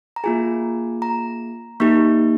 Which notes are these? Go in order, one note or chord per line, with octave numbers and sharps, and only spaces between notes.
A#5
A#3 F4 G#4 G#5
A#5
A#3 D#4 G4 C#6